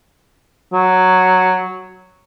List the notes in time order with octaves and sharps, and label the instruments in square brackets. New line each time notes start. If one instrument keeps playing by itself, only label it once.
[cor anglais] F#3